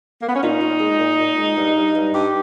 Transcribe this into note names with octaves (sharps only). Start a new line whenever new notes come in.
A#3
B3
C#4
A#2 D#4
A#2
G#3
A#2
A#2
G#3
G2
G2
G2
G2 G4